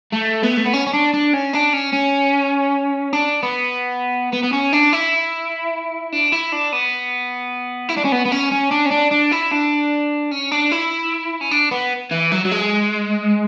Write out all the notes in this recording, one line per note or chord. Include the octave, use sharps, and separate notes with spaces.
A3
B3
A3
B3
C#4
C#4
D4
D4
C#4
D4
C#4
C#4
D4
B3
B3
B3
C#4
D4
E4
D4
E4
D4
B3
E4
D4
C#4
B3
B3
C#4
C#4
D4
C#4
D4
D4
E4
D4
C#4
D4
E4
C#4
D4
B3
E3
F#3
F#3
G#3